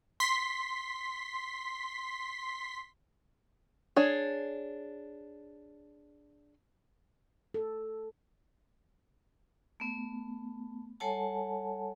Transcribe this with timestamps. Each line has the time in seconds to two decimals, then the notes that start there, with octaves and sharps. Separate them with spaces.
0.20 C6 B6
3.96 D4 G#4 C#5
7.54 A4
9.80 A3 B3
11.00 G3 A4 C#5 F#5 G#5 A5